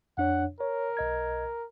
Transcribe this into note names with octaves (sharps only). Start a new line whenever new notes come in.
F2 D4 C#5 F#5
A#4 C#5
B1 D#5 G#6